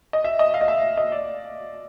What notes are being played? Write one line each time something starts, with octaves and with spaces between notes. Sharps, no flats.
D#5
E5
D#5
F5
D#5
E5
D#5
D5